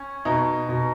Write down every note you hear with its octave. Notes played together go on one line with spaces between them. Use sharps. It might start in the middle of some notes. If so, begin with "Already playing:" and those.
Already playing: C#4
B2 D#4
B2